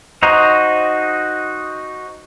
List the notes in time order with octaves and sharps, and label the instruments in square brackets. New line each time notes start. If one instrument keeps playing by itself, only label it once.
[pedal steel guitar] D#4 F#4 C5 D#5 A#5